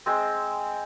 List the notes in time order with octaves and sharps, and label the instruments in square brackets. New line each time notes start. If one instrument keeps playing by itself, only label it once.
[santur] G#3 C4